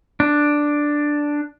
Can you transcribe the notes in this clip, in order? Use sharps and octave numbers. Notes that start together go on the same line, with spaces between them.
D4